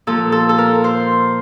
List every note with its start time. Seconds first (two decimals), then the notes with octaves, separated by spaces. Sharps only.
0.07 A#2 F3 A4
0.32 A4
0.49 A4
0.58 A#4
0.84 C5